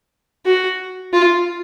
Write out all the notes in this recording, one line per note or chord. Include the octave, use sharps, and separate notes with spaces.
F#4
F4